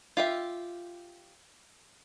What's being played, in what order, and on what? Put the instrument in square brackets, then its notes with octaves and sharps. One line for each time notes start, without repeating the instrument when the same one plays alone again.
[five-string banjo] F4 G4 E5